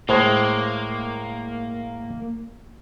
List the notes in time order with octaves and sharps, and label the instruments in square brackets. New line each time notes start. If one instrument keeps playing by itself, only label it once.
[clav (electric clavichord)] A2 G#3 [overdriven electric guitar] A#3 [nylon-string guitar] C5